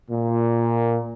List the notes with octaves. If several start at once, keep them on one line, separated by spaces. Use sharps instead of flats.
A#2